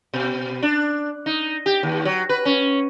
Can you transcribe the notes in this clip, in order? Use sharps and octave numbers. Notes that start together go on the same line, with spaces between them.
B2
D4
D#4
G4
D#2
F#3
B4
C#4